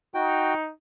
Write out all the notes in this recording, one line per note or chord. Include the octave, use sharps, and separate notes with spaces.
D#4 F#4 G5